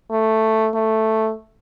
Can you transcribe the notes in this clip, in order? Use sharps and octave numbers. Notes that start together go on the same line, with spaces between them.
A3
A3